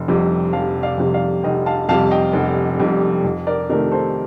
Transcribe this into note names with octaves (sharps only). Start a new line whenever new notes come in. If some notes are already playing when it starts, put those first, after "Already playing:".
Already playing: F1
F2 C3 G3
F1 F5 A5
D5 F5
F2 C3 G3
D5 F5
F1 D#5 G5
F5 A5
F2 C3 G3 F5 A5
D#5 G5
F1
F2 C3 G3
F2
A#4 D5
C3 D#3 A3 A#4 D5
A4 C5